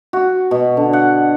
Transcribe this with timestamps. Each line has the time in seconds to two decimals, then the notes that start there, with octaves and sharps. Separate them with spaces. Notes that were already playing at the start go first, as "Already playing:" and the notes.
0.13 F#4
0.51 B2
0.77 D3
0.93 F#5